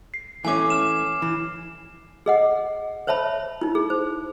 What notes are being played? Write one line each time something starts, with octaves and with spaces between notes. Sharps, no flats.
C7
E3 A3 C#4 G#5 D6
F6 E7
E3
G#4 D#5 F#5
C5 C#5 E5 A5 B5
D#4 E4
G#4
C5